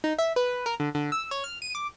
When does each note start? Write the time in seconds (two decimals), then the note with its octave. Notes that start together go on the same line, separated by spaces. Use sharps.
0.04 D#4
0.19 E5
0.36 B4
0.66 A#4
0.80 D3
0.95 D3
1.12 E6
1.31 C#5
1.44 F6
1.62 D#7
1.75 D6